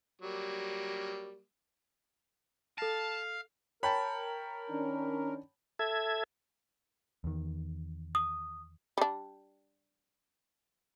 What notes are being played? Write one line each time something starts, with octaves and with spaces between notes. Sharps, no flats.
F#3 G3 A#3
A4 F5 A5 A#6
A#4 C#5 G5 A5 B5
D#3 C#4 D4
A4 E5 G#6
E2 D#3
D#6
G3 D4